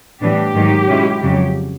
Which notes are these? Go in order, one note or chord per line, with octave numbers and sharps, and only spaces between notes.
A2 E3 G3 B3 D4 G4
G#2 D#3 F#3 A#3 D#4
B2 G#3 C#4 E4
F2 C#3 F#3